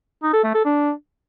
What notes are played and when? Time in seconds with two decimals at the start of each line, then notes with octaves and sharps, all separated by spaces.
0.23 D#4
0.33 A4
0.44 A3
0.54 A4
0.65 D4